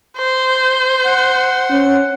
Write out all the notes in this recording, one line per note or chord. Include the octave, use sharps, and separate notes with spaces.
C5
F#5
C#4